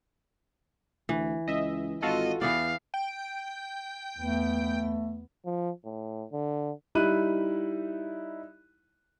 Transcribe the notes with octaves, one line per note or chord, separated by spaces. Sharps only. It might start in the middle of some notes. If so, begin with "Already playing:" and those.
D2 E3
C#2 D#5 E5
G#1 F4 F#4 A4 D#5
E2 E3 B3 D5 F5
G5
E2 A3 B3
F3
A2
D3
G3 D#4 E4 B5 F#6 D#7